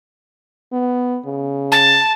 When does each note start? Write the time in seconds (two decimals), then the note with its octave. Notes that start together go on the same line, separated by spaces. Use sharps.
0.72 B3
1.26 C#3
1.72 A5